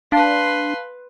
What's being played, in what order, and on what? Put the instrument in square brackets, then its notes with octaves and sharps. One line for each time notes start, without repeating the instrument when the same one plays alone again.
[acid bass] D4 [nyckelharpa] B4 C6 [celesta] F5 A5